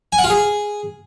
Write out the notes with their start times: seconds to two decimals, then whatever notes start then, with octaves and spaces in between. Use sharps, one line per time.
0.12 G#5
0.18 F#5
0.24 F4
0.30 G#4